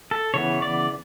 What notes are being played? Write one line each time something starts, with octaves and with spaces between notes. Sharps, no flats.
A4
C#3 E3 B3 C#5
D5